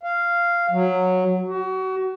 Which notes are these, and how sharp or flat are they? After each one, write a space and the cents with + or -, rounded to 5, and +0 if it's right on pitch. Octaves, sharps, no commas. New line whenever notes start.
F5 -10
F#3 -10
F#4 +30